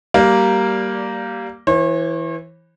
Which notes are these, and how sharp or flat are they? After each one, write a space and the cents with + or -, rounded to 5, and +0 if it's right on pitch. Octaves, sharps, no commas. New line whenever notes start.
G3 -15 A#3 +0 D5 +0
E3 +0 C#5 -45